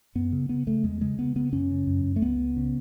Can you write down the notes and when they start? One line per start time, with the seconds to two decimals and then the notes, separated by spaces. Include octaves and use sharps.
0.15 F#2 B3
0.32 C#3
0.49 C#3 B3
0.67 C#3 A3
0.84 E2 G#3
1.01 C#3 G#3
1.19 C#3 B3
1.36 C#3 B3
1.52 F#2 C#4
1.71 C#3
1.87 F#2
2.04 F#2
2.16 A3
2.22 C#2 B3
2.39 C#2
2.57 C#3